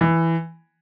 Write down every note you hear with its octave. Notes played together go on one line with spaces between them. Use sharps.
E3